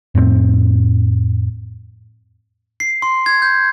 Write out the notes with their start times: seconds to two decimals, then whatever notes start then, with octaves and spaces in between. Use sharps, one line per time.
0.15 F2 A2 B3 C4
2.80 C7
3.02 C6
3.26 G#6
3.42 G6